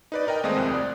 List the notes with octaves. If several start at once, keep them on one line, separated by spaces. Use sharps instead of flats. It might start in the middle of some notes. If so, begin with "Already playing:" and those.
D#4 B4 D5
D#4 A#4 D#5 G5
D#2 G#3 A3 C4 D#6
C2 F2 F#6
D5